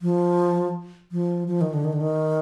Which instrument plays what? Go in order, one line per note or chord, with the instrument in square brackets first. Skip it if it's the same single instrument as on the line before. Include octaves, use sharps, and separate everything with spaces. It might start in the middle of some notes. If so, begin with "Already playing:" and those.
[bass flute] F3
F3
F3
D#3
D3
D#3
D3
D#3